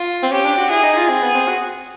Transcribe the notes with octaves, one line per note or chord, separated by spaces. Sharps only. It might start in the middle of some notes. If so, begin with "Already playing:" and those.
Already playing: F4
C4
C#4 G4
D4
F#4
E4 G#4
D#4
F4
C4
B3
C4
F#4